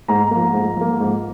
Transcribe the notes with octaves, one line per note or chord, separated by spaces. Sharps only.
G#2 A#5
F3 A#3
G#2
F3 A#3
G#2